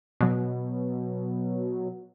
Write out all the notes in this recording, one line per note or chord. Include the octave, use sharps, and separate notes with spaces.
B2 F#3